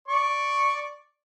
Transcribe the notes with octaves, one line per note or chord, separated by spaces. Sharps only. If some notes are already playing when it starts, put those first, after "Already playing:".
D5 C#6